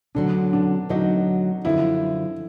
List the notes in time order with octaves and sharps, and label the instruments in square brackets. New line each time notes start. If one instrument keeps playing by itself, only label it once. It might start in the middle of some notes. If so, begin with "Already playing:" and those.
[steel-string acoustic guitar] D2 D3 F#3 [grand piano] D4
[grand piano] D4
[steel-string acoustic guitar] D2 D3 F#3 [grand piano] D#4
[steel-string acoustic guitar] F#2 D3 F3 [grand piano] E4